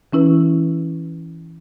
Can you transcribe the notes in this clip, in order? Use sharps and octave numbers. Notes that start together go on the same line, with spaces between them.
E3 C#4 E4 B4